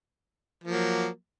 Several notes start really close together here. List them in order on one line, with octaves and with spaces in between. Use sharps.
F3 A#3 F#3